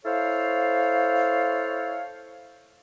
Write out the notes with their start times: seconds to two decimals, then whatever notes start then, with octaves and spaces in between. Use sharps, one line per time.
0.05 E4 A4 C5 C#5 F5